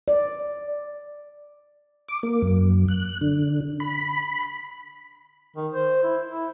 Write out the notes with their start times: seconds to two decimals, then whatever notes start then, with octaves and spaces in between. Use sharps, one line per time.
0.08 D5
2.09 D6
2.23 A#3
2.42 F#2
2.88 F#6
3.21 D3
3.80 B5
5.57 D#3
5.73 C5
6.04 E4
6.29 E4